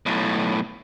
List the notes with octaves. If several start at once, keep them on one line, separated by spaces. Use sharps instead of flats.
B1 A2